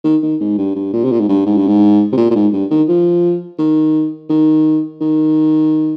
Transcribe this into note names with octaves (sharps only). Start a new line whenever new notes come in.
D#3
D#3
G#2
G2
G2
A#2
C3
A#2
G#2
G2
G#2
G2
G#2
C3
A#2
A#2
G#2
G2
D#3
F3
D#3
D#3
D#3